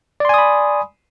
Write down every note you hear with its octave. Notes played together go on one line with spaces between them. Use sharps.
D5 G#5 B5 C6 D#6